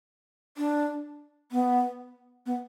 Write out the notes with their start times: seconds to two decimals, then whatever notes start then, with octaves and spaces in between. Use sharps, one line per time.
0.57 D4
1.52 B3
2.46 B3